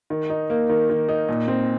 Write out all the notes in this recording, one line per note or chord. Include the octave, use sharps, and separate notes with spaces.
D#3
D#4
A#3
D#3
D#3
D#4
A#2
C4